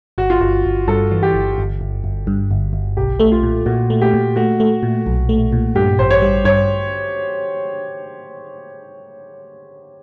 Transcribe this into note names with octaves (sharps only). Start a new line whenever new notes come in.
G1 F#4
F4
G1 F#4
G1
G2 A4
E3
G4
G1
G1
G1
G1
G2
G1
G1
B1 G4
A3
F4
A#2
A#2 F#4
A3
G4
A#2
A3 F#4
A3
A#2
B1
A3
A#2
G2 G4
A1 C5
C#5
G3
G2 C#5